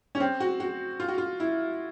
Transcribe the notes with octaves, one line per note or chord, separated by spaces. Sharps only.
C#4
C4
F#4
F#4
F4
F#4
F4
E4